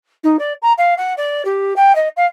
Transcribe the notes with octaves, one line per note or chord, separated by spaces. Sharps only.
D#4
D5
A#5
F5
F#5
D5
G4
G5
D#5
F5